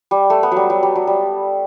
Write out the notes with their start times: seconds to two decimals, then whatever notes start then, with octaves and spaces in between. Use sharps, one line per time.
0.11 G3
0.30 A3
0.43 B3
0.51 F#3 G3
0.70 F#3
0.83 G3
0.95 F#3
1.07 G3